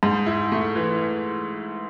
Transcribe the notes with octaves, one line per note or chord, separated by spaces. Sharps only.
G#2
E4
A3
E3